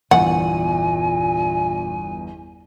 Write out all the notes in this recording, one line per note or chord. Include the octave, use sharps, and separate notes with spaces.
G1 E2 A#2 F#5 G#5